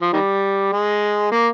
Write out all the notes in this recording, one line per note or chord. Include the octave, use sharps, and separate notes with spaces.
F3
D#3 G3
G#3
A#3